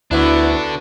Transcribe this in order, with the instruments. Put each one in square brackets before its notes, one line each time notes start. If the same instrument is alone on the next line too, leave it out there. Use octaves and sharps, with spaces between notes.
[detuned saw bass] D2 [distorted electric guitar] D3 D4 [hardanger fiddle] B3 F#4 [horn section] E4